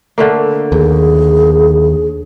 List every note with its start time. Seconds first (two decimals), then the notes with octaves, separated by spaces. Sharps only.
0.18 D3 A3 A#3
0.72 D#2 G#4